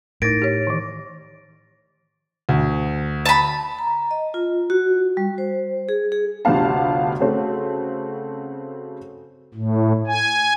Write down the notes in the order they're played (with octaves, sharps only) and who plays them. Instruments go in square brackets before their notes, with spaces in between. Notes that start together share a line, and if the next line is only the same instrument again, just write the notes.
[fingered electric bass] A2 [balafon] D#4 A#4 [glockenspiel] A6 A#6 D7
[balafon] G4 C#5
D#3 E3
[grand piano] D2
[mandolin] A5 B5
[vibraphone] A#5
D#5
F4
F#4
G3
C5
G#4
G#4
[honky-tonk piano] G1 D2 C3 B3 F5 A5
C#3 A3 C4 F#4
[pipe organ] A2
G#5